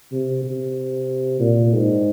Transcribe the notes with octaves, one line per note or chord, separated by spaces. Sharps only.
C3
C3
A#2
G#2